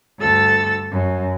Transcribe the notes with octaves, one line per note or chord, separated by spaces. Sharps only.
D2 G2 A4 E6 A6
F#2